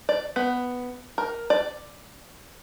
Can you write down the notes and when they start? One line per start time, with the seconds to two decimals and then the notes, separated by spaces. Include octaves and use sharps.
0.09 D5
0.36 B3
1.18 A#4
1.50 D5